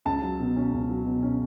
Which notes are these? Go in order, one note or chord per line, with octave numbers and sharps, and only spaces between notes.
C#2 A5
F#3
B2
C#4
C#2
F#3
B2
C#4